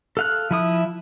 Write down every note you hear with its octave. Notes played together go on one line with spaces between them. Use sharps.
A4 F5 F#6
F3 E4 D#6